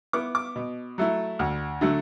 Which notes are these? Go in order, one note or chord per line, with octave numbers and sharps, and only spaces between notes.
B3 E4 D6
D6
B2
F#3 A3 E4
D2
D3 F#3 A3